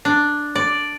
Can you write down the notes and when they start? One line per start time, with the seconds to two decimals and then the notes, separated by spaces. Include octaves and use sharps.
0.05 D4
0.55 D5